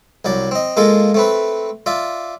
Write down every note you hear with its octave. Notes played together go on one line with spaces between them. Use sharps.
C2 F#3 D5
C4 D#5
G#3 A#3 F4 A4 A#4
A3 C4 B4
F4 D5 E5